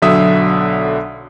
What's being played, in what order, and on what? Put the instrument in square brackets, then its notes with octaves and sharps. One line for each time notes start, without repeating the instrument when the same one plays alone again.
[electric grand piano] B1 D3 F#3 E5 D#6